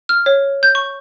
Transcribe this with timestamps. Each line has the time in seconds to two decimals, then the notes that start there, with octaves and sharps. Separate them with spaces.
0.09 F6
0.26 C#5
0.63 G6
0.75 C#6